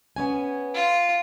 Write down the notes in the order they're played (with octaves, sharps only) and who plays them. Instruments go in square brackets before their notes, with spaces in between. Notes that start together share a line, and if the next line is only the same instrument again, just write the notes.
[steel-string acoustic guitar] B3 C#4 G#5
[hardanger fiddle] F4